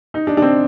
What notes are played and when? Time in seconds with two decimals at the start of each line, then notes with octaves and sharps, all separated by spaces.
0.14 D#4
0.27 D4
0.37 D4
0.42 C4